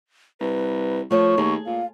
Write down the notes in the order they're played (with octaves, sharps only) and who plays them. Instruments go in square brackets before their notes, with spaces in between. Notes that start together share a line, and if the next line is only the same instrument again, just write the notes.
[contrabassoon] C2 [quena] B4
[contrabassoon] F3 [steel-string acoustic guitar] A3 C#5 [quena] C#6
[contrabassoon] D#2 [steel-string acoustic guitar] G#4
[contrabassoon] A#2 [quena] F5